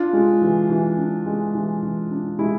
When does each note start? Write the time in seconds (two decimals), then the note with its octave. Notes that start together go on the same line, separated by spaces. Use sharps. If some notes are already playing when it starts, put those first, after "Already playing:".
Already playing: D4 F4
0.13 G#3
0.42 E3
0.70 E3
0.97 D4
1.26 G#3
1.55 E3
1.83 E3
2.11 D4
2.39 G#3 E4